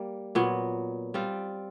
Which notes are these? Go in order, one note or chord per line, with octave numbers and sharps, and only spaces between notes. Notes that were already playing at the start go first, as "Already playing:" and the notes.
Already playing: G3 A#3
A#2 F#3 B3
G3 C4 F4